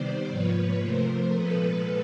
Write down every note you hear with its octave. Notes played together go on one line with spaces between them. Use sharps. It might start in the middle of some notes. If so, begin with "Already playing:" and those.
Already playing: C3 D#3 G3 B3 C5 D5
G#2 F3 A#3 B4 C#5
C3 F3 A3 A#4 C5
A#2 F3 G#3 B3 A4 B4